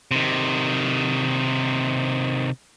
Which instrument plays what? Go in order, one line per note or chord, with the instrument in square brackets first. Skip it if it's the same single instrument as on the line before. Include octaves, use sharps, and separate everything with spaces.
[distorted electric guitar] C3 D#3